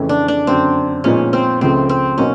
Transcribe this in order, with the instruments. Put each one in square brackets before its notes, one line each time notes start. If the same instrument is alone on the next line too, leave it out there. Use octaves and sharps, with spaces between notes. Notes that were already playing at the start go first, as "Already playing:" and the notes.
Already playing: [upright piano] F2 C#3 E3 A3 C#4
[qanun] D4
D4
[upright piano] F#2 D3 F#3 [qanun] C4
[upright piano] A#2 F3 G#3 B3 D#4 [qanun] C#4
[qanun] C4
[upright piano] C#2 C#3 F3 A3 [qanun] C4
[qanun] C4
[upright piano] B2 F#3 A#3 D#4 F#4 [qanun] C#4